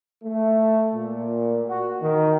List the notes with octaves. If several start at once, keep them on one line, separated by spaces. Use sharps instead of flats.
A3
A#2
F#4
D#3